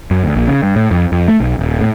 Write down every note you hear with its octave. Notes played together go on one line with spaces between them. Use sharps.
F#2
D2
A#1
C#3
G2
A2
F2
F2
A3
B1
D#1
A2